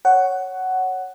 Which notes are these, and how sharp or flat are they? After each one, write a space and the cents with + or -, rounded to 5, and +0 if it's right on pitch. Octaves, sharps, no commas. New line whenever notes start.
C#5 +0 F#5 +10